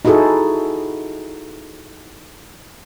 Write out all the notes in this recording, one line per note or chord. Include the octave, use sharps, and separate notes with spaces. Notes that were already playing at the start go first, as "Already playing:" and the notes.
D#4 E4 F#4 G#4 A4